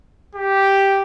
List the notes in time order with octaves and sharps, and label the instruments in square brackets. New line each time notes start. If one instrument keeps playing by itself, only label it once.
[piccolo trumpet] G4